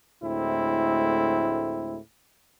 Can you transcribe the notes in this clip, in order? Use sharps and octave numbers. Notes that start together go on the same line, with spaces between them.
D2 A2 G#3 C4 E4